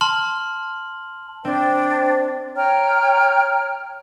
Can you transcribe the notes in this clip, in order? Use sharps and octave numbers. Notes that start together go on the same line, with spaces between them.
A5 C6 F6 F#7
C4 D4 C5 G5
C#5 G5 A#5 F6